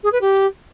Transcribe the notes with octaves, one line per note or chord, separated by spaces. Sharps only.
G#4
B4
G4